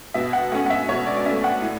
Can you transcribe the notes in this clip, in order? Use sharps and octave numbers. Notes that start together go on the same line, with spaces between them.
B2 E5
F#5
A3 C#4 F#5
F#5
E5
B2 C#5
D5
D5
A3 C#4 E5
F#5
A2